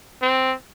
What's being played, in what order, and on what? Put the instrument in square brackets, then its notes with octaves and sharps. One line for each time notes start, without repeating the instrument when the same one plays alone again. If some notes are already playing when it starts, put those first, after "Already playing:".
[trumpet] C4